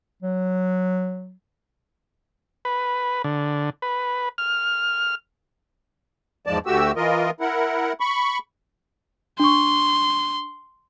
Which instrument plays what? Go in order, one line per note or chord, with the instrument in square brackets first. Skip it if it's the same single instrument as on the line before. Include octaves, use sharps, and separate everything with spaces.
[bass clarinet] F#3
[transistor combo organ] B4
D3
B4
F6
[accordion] E2 G#2 F3 G#3 D5 A5
D2 A3 F#4 G4 E6
E3 F4 A#4 D#5
E4 A#4 F#5
B5 C#6
[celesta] D4 C#6 [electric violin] C6